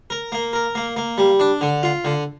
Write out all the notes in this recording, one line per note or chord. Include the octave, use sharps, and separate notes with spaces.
A#4
A#3
A#4
A#3
A#3
G3
D4
D3
F4
D3